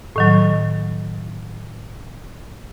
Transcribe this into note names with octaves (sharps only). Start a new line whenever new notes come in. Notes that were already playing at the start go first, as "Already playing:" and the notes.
A2 D#3 F#3